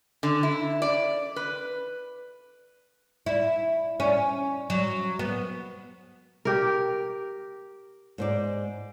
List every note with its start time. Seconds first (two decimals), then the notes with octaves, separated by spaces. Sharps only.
0.23 D3
0.43 E4
0.82 D5
1.36 B4
3.26 E4
4.00 C#4
4.70 F#3
5.19 B3
6.45 G4 A#4
8.18 G#2 C5 D5